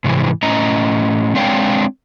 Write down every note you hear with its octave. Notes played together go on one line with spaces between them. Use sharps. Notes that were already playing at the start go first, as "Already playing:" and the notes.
G#2 C3 E3
A2 C#4 D#5 A#5
G#3 C4 D4 C#5 F5 G5